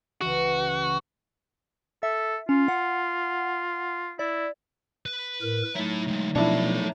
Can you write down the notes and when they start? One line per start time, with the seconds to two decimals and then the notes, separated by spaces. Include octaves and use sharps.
0.21 C#2 E3 F#4
2.03 A4 E5
2.49 C#4 F4
2.68 F#5
4.19 E4 D5
5.06 B4
5.42 A2 A#4
5.76 F#3 A3 D#4 E4 A4
6.07 D3 G#3
6.36 B2 F3 D4 E4 A4 C#5